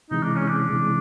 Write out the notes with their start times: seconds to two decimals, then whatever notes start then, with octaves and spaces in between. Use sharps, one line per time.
0.10 C3 E3 G#3 D#4
0.23 D4
0.36 C#4
0.48 D4
0.70 C3 E3 G#3